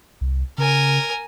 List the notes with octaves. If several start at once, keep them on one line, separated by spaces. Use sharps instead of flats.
C2
C#3 A#4 G#5